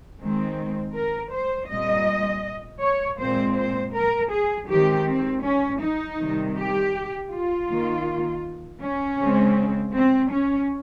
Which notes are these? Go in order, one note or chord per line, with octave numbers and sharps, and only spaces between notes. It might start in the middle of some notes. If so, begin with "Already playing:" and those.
D#3 G#3 C4
A#4
C5
A#2 G3 C4 D#5
C#5
A#2 G#3 C4 C5
C5
A#4
G#4
D#3 G#3 C4 G4
C4
C#4
D#4
C3 D#3 G3
G4
F4
D#3 A#3
C#4
C#3 G#3 C4
C4
C#4